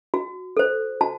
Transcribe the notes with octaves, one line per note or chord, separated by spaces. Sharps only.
F#4
A4 C5
F#4 A5